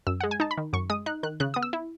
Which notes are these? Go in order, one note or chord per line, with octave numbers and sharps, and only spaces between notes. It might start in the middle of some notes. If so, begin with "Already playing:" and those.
F#2 E6
G#3 F#5
G#5
D#4 A5
B5
D#3
F#2 C#6
G#3 D#6
D#4 F#6
D#3 F#6
C#3 F#6
B3 D#6
E6
E4